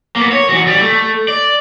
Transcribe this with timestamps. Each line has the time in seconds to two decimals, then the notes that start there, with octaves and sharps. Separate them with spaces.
0.16 A#3 B3
0.32 C#5
0.49 E3 F#4
0.67 G3 G4
0.81 A3
1.28 D5